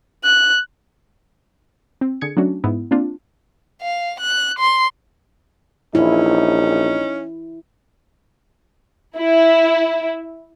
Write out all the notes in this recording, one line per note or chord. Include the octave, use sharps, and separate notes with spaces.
F#6
C4
D3 G#4 G#6 C#7
F#3 A3 C#4 D4 F#4
G#2 B3 E4
A#3 C4 D4 F4
F5
F#6
C6
A#1 C#4 D#4 E4
E4